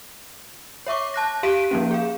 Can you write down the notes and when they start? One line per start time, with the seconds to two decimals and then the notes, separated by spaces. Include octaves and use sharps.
0.87 C#5 E5 C#6 D6
1.14 A5 F#6 A#6
1.43 G4 F5 C6 B6 D7 D#7
1.71 F3 A#3 C#4
1.91 G#4 F5